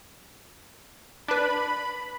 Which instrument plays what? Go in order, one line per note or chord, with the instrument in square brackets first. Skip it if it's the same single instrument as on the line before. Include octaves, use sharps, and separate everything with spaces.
[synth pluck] D4 B4 [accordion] B5